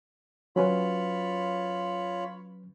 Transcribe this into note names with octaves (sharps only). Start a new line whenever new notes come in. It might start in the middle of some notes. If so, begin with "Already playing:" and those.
F#3 C#4 F4 B4 C#5 B5